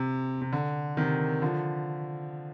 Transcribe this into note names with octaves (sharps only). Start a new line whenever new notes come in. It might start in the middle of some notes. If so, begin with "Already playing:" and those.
Already playing: C3
C3
D3
C3 D#3
D3 F3